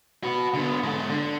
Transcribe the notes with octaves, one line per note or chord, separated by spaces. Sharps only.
F#4 B4
D3 B3
G#2 A4
D3